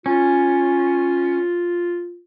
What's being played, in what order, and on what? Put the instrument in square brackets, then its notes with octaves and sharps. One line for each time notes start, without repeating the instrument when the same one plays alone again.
[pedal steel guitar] C#4 [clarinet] F4